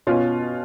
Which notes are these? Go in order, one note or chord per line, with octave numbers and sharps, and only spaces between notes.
B2 C#4 F4